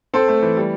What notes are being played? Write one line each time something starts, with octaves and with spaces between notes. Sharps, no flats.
C4 A4 C5
A3
E3
G3